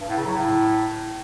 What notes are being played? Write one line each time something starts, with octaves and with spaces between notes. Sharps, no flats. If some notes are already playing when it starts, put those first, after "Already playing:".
G2
A2
C#3
F#3
A2